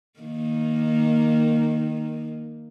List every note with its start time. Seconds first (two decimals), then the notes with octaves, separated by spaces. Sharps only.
0.20 D#3 A#3